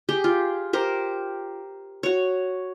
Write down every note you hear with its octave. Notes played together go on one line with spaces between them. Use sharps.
G4 G#4 G5
F4
G4 A#4 C5
F#4 C#5